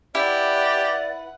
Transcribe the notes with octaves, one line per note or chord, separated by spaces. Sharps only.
E4 G4 B4 D5 F#5